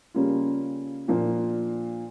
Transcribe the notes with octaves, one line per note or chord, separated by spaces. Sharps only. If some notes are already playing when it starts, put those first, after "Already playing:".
C#3 G3 A#3 C#4 F4
A#2 F3 A#3 D4 F4